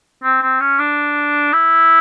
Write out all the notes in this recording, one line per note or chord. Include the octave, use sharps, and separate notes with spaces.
C4
C4
C#4
D4
E4